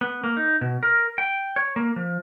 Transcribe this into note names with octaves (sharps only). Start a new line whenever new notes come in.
B3
A#3
D#4
B2
A#4
G5
C#5
A#3
F3